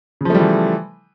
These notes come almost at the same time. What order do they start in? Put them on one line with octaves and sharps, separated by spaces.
C#3 F3 A3 G3 E3